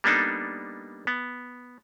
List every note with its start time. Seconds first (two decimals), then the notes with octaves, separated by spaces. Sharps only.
0.04 G3 A#3 B3 D4 D#4 A4
1.07 B3